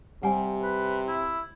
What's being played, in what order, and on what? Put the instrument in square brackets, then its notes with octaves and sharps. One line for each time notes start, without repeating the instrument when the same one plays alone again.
[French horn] C3 [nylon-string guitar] G3 [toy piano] F#5 G#5
[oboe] B4
E4